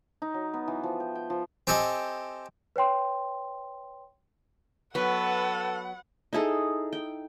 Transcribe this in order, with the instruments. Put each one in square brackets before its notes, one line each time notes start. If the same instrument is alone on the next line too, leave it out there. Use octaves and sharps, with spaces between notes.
[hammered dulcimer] D#4
F#3
B3
E3
F3
G5
G5
F3
[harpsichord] C4 G4 A4 D#5 G#5
[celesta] B4 C#5 G5 C6
[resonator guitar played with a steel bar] F#3 B3 [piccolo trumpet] A4 [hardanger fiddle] B4 [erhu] F#5
[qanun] D#4 E4 G#4 A4
G5